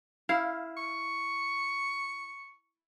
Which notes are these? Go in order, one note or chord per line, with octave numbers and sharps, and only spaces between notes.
E4 F5
C#6